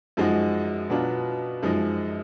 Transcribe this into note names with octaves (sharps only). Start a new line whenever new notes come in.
F#2 F3 G#3 D#4 F#4
B2 F#3 B3 D4 F4
F#2 F3 G#3 D#4